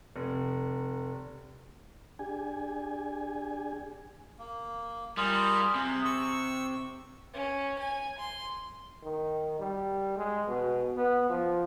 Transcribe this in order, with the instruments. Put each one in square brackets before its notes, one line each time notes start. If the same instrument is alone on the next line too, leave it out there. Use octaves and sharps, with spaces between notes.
[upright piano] F1
[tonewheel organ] D4 G4 G#4 G#5
[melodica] A#3
[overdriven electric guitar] G3 [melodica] F4 G#4 A#4
[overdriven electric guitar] C3 [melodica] G#4
[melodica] C#6 E6
[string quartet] C#4
G#5
C6
[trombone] D#3
G3
G#3
B2
B3
F3